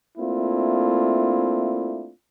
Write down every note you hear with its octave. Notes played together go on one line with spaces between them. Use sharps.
A3 A#3 C4 D4 E4 F4